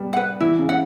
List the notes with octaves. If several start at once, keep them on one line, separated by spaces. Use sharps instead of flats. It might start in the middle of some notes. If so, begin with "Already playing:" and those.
Already playing: G3 B3
B4 F#5
E3 E4
C#3
F#5